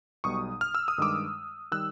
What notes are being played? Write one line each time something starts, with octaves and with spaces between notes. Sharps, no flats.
B1 B2 G3 C#6 D#6
F6
E6
D#6
G2 D#3 G#3 D6 E6
D#3 G3 E6 F#6